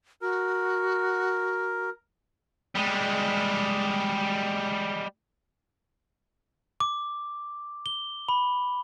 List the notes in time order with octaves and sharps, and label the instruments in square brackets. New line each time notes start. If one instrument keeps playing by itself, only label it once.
[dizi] F#4 [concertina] A#4
[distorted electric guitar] G3 G#3
[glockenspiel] D6
G7
B5